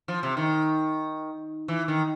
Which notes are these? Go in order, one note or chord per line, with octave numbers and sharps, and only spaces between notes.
F3
C3
D#3
E3
D#3